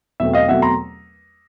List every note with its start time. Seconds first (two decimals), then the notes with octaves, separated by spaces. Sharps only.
0.20 E2 B2 F#3 A3 C4 E5
0.33 D#5 F5
0.48 E2 B2 F#3 A3 C4 E5 F#5
0.62 A#5 C6